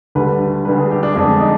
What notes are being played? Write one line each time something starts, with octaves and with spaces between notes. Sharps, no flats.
D2 D3 G3 B4
D2 D3 G3 B4
G#4
G4
D4
F2 D3 G#3 D4
D#4